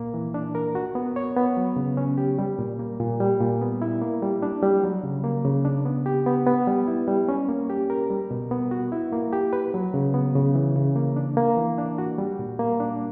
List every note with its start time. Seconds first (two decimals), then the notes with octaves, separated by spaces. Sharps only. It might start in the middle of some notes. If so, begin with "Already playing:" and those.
Already playing: A#2 A#3
0.14 E3
0.34 D4
0.55 A#4
0.75 F#4
0.95 B3
1.16 C#5
1.36 B3
1.57 F#3
1.76 C#3
1.97 C#4
2.18 G4
2.39 G3
2.59 A#2
2.79 A#3
3.00 A#2
3.20 G3
3.40 A#2
3.61 B3
3.82 E4
4.01 A#3
4.22 G3
4.43 D4
4.63 G3
4.84 F#3
5.03 C#3
5.24 A#3
5.45 C#3
5.65 D4
5.85 B3
6.06 G4
6.26 B3
6.46 B3
6.67 G3
6.88 E4
7.07 G3
7.29 C#4
7.49 A#3
7.70 G4
7.90 A#4
8.10 G3
8.31 B2
8.51 B3
8.71 F#4
8.92 E4
9.12 A#3
9.33 G4
9.53 B4
9.74 F#3
9.94 C#3
10.14 B3
10.35 C#3
10.55 E3
10.76 C#3
10.96 A#3
11.16 D4
11.37 A#3
11.57 E3
11.78 D4
11.98 F#4
12.18 G3
12.39 A#2
12.59 A#3
12.80 D4